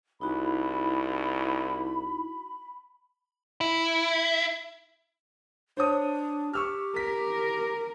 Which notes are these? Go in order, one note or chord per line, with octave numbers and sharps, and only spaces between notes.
C2 D#4 E4 F#4 B5
E4
D4 C5 C#5 D#6
G4 C#6 E6 F6
A#4 B6